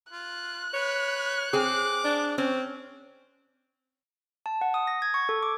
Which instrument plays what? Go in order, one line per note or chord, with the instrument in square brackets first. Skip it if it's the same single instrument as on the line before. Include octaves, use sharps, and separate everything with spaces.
[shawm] F4 [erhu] F#6
[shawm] B4 [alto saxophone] C#5
[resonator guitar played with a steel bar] C4 G#4 [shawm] D6
[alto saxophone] D4
[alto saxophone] C4 [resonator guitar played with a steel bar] C#4
[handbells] A5
F#5
D#6
A#6
G#6
C#6
A4
D6